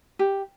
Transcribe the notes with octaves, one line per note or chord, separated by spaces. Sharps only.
G4